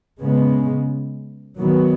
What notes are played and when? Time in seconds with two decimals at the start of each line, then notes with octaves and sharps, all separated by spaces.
0.22 C#3 G#3 B3
1.58 D#3 F#3 B3